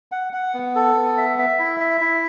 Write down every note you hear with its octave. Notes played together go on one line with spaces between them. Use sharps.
F#5
F#5
B3
A4
B3
E5
E5
E4
E5
E4